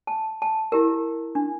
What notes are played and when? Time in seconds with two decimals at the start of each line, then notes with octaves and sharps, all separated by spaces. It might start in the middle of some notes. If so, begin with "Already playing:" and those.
0.07 A5
0.42 A5
0.72 E4 G4 A#4
1.35 D4